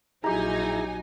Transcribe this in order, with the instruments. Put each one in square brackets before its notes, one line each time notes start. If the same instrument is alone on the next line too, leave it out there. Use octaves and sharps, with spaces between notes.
[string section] A#1 D#4 G#5 [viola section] F#3 [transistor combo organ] E4 G#4 [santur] G4 A#5